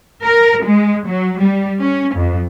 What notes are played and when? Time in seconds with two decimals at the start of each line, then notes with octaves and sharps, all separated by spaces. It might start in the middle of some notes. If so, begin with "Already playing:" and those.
0.24 A#4
0.65 G#3
1.07 F#3
1.40 G3
1.81 C#4
2.15 F2